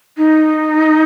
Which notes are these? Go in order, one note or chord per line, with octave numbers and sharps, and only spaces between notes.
D#4